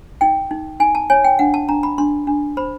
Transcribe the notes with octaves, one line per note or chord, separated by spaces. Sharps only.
D#4 G5
D#4
D#4 G#5
A5
C#5 G#5
G5
D4 F#5
A5
D4 A#5
B5
D4 C6
D4
C5 B5